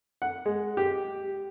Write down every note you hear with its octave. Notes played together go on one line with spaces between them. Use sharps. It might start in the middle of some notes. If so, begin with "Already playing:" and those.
F#5
G#3
G4